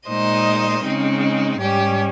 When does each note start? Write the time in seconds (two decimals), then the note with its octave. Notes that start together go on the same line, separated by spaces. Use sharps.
0.08 A#2 G#3 D#4 C5 D#5
0.84 C#3 G#3 C4 D#4
1.60 G#2 G3 C#4 G4